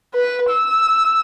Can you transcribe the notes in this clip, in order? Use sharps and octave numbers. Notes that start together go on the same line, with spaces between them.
B4
E6